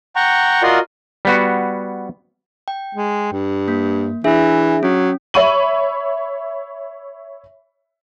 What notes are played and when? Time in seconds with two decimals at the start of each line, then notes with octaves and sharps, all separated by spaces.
0.16 F#5 G5 A#5 C#6
0.63 F4 F#4 A#4 D5 D#5 C6
1.25 G3 B3 F#4
2.68 G5
2.95 G#3
3.32 G2
3.68 A#3
4.24 E3 D4 G#4 E5
4.83 F#3 C#4
5.34 C#5 E5 B5 C#6 D#7 F#7